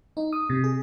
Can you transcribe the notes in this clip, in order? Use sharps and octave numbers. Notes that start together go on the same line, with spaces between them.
D#4
D#6
C3
G#4